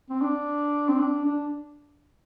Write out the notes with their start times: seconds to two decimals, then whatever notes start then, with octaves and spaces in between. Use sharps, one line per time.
0.10 C4
0.21 D4
0.89 C4
1.00 D4
1.25 D4